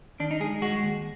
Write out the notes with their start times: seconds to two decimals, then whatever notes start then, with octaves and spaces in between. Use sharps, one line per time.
0.20 D#3 D4
0.31 D#4
0.40 G#3 G#4
0.62 G#3 F#4
0.83 D#2